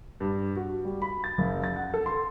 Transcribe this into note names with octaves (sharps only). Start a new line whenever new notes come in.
G2
F#4
G3
B5
A6
F#1
A6
F#5
A4
C6